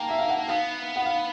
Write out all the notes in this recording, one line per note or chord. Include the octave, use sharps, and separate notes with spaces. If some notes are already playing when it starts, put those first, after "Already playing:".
Already playing: A#3 G5 A5 A#5
E5
F5
F#5
B3 F5
F#5
F5